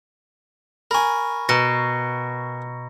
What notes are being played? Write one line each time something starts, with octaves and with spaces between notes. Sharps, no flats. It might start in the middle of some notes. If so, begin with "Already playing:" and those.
A#4 G#5 B5 C#6
B2 A#5 A#6